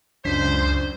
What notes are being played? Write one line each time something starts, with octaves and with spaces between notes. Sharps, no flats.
C#2 F#2 D4 C5 B6